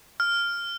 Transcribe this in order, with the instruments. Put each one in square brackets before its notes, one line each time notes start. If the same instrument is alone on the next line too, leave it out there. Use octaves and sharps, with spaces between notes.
[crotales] F6